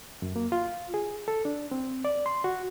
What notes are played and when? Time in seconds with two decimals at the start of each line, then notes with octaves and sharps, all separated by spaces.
0.22 F#2
0.36 A#3
0.52 F4
0.94 G#4
1.28 A4
1.45 D4
1.71 C4
2.05 D5
2.26 C6
2.44 F#4